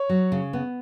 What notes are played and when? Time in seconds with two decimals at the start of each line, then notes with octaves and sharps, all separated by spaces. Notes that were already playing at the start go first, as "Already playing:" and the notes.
Already playing: C#5
0.09 F#3
0.32 C#3
0.53 B3